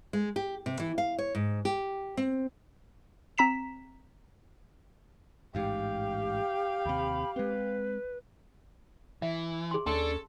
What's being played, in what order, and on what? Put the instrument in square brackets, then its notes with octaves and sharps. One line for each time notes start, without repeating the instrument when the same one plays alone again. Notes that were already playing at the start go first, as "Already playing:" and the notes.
[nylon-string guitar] G#3
G4
C3
E3
F5
C#5
G#2
G4
C4
[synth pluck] C4 A#5 B6 E7
[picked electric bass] A1 G#2 [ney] G4 [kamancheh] F5 G5
[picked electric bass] D#2 C3 [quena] B5
[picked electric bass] G#3 C4 [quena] B4
[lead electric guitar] E3 [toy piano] E5
[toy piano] G#4 C6
[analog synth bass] D#2 [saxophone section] C#4 A4 [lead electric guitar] D4 [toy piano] A5 C6